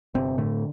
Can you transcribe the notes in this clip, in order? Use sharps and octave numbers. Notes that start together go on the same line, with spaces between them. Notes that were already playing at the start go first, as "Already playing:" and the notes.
G1 C3 C4
A2 D3 A3